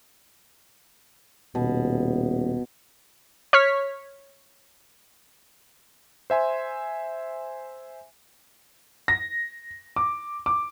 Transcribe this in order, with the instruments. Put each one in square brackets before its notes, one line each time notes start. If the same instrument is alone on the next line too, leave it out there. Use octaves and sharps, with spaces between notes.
[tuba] D#1 [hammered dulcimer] B2
[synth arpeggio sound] C#5 C#6 F6 B6
[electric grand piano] C5 E5 G#5 C6
[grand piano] A#6
D6
D6